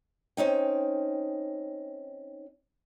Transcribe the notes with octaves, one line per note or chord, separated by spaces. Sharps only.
C4 C#4 D#4 G5